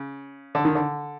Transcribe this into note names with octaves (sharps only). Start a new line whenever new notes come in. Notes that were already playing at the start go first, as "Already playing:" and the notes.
Already playing: C#3
D3
D#3
D3